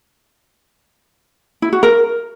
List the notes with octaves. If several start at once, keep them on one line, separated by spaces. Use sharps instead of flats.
E4
F#4
A#4